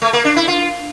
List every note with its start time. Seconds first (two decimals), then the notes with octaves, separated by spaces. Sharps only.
0.02 A3
0.13 A#3
0.25 D4
0.36 E4
0.48 F4